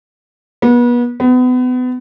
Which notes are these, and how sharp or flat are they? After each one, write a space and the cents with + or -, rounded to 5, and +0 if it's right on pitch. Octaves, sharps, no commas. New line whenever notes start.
B3 -35
B3 +30